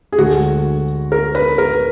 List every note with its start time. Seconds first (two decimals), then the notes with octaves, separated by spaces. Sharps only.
0.12 G#4
0.18 D2 D3 G#3 F#4
1.12 A#4
1.35 B4
1.58 A#4